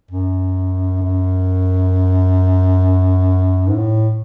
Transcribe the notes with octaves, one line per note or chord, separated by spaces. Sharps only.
F#2
F#2
G#2
A2